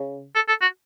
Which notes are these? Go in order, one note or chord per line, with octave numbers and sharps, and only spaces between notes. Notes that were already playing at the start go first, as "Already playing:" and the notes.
Already playing: C#3
A4
A4
F#4